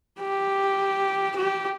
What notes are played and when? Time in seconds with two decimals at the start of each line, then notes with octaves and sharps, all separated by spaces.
0.20 G4
1.36 G4